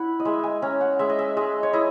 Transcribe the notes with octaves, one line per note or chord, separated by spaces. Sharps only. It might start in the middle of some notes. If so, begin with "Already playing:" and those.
Already playing: E4 F#5 B5
D#5
G#3 E5
G#5
C#4 A#5
F#5
G#3 E5
D#5
E5
G#3 D#5
C#5
E4 D#5